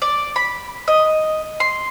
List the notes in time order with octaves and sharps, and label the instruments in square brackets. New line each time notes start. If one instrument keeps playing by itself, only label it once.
[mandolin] D5
B5
D#5
C6